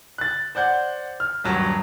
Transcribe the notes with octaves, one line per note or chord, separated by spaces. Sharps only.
F#6 A6
C5 D5 F#5 G6
F6
D#1 G2 F#3 A5